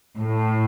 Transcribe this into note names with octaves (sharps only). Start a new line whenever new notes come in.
A2